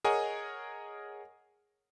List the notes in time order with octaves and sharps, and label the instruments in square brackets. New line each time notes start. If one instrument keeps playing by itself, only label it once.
[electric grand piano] G#4 A#4 C#5 D#5 F#5 G#5